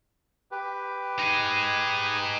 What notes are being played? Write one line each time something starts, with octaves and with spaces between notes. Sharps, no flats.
G4 B4
D#4 G#4